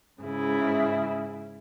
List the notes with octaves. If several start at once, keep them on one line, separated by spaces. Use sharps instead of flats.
G#2 C#3 E4